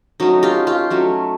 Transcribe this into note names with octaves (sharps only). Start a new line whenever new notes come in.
F#3 A3 C#4 D#4
F4 G4
F4 G4
F#3 A3 C#4